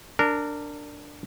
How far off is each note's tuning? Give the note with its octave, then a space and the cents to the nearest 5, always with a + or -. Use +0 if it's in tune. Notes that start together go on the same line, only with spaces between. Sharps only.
D4 +0 A#4 -20